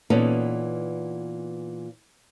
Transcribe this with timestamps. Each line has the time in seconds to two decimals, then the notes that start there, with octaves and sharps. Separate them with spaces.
0.10 A#2 E3 B3 C#4 D#4 A4